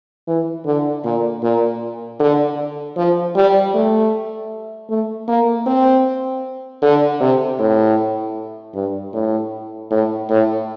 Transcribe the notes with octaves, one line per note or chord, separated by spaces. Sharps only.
E3
D3
A#2
A#2
D3
F3
G3
A3
A3
A#3
C4
D3
C3
A2
G2
A2
A2
A2